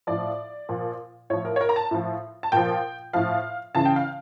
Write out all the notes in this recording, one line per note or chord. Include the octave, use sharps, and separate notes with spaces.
A2 F3 D5
A#2 F3
A2 F3 C#5
A#4
C#5
A#4
A#5
A5
A2 F3
A5
A#2 F3 G5
A2 F3 F5
C#3 E3 A5
G5
F5